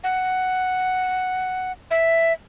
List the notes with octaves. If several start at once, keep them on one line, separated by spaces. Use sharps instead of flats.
F#5
E5